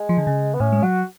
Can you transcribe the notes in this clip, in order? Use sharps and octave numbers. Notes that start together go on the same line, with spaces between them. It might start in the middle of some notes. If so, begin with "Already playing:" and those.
Already playing: G#3
F3
D3
C#3
B3
A2 C#4
G#3
F#3 F#4